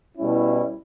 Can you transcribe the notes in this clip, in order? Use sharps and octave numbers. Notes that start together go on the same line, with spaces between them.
B2 G3 C#4 E4